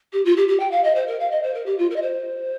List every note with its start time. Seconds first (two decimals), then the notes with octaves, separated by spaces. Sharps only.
0.13 G4
0.25 F4
0.37 G4
0.48 G4
0.60 G5
0.72 F5
0.84 D#5
0.95 C5
1.07 A#4
1.20 F5
1.31 D#5
1.43 C5
1.54 A#4
1.66 G4
1.79 F4
1.90 A#4
1.96 D#5
2.02 C5